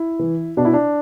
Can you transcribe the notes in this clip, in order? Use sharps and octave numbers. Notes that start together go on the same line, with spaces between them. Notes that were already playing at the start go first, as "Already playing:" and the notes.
Already playing: E4
E3
B2 D4
E4
D4